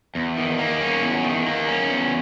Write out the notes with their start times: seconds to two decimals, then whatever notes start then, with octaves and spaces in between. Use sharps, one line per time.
0.15 E2
0.37 D#3
0.59 A#3
0.81 C#4
1.02 E2
1.24 D#3
1.46 A#3
1.68 C#4
1.90 E2